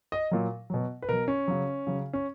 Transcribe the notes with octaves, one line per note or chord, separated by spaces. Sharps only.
D#5
A#2 F#3
B2 F#3
B4
B2 F#3 A#4
C#4
C#3 F#3
C#3 F#3
C#4